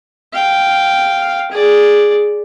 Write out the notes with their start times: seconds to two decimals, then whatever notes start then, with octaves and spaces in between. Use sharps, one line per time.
0.32 F5 G5
1.51 G#4 D5